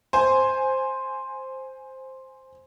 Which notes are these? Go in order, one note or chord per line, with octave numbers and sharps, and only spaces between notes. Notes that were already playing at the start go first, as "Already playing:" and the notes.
C5 G#5